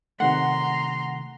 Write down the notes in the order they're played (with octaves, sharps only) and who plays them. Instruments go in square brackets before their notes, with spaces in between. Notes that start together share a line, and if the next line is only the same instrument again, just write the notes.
[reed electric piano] C3 D#3 A3 [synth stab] F#5 [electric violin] A#5 C6